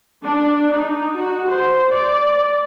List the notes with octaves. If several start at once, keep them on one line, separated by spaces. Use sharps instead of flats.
D4
D#4
F#4
C5
D5